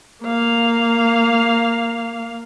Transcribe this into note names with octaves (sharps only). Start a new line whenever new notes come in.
A#3 F5